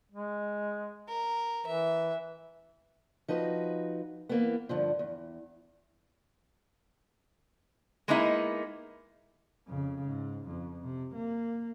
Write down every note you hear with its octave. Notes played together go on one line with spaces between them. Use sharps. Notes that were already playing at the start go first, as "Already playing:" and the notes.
G#3
A#4
E3 E5
F3 D#4 F#4 B4
E3 A#3 B3
G2 D3 F3
E2
G#3 A#3 B3 D#4 E4
F2 C#3
G#2
F2
C3
A#3